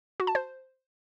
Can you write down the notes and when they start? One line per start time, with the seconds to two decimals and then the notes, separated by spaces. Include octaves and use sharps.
0.20 F#4
0.27 A5
0.35 C5